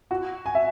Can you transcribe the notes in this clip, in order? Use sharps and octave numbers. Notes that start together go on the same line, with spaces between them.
F#4
G#5
E5